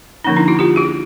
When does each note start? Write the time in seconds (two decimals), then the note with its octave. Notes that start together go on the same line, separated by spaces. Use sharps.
0.24 D3 F3 A#3 C#4 D#4
0.36 D4 E4
0.48 E4 F#4
0.59 F4 G4
0.76 F#4 G#4